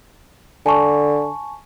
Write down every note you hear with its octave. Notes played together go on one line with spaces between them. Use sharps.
D3 G#5 A5 C#6